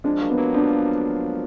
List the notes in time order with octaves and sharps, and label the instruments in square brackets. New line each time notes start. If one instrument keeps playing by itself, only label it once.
[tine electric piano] F3 G#3 [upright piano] D4
[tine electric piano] F#3 A#3
[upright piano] B3
[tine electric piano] F#3 A#3
[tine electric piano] F3 [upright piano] D4